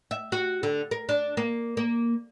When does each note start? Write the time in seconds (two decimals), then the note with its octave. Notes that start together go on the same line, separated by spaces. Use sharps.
0.11 E5
0.32 F#4
0.63 D3
0.91 A#4
1.09 D4
1.37 A#3
1.77 A#3